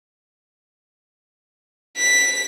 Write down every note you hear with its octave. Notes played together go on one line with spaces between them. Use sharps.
B6